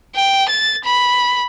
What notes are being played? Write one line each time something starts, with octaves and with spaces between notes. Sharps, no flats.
G5
A6
B5